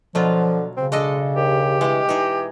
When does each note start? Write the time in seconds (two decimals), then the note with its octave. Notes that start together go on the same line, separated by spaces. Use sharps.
0.15 B2 D3 F3 F#3 F4
0.77 C#3 C4
0.92 G#3 D4 A4 D#5
1.36 D#2 G4
1.81 E3 G3 G#3
2.09 E3 D#4 G#4